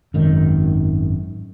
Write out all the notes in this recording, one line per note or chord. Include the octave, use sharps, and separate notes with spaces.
G#1 F#2 D#3